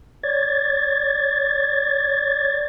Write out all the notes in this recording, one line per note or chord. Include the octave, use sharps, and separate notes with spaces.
C#5 D5 G#6 A6